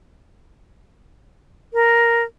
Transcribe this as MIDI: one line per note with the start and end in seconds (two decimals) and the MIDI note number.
1.73 2.23 70